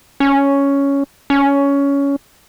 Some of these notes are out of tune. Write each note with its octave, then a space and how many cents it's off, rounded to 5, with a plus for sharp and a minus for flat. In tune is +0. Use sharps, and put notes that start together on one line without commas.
C#4 +5
C#4 +15